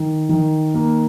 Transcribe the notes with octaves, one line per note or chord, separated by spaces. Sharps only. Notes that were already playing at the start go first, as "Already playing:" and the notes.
Already playing: D#3
D#3
A#3